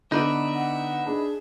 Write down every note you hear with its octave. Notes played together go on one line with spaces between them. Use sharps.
D3 B3 D#4 B4 D5 E5
F#5
D4 G#4